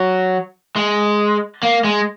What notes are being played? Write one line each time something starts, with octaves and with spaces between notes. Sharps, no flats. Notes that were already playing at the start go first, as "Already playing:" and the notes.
Already playing: F#3
G#3
A#3
G#3